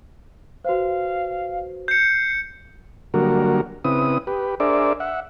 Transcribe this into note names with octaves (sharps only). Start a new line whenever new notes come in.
F#4 B4 C5 F5
G6 C7 C#7
D3 F#3 G3 A#3 F#4 A#4
C#3 C4 E4 B4 D#6
G4 B4
D4 G#4 A#4 C5 D5 E5
E5 F#5